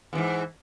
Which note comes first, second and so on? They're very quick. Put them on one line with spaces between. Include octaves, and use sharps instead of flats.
E2 E3 G#2